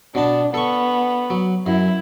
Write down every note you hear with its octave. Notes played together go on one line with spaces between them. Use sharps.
B2 B3 D4 A5
B3 A4 C#6
F#3
F#2 E4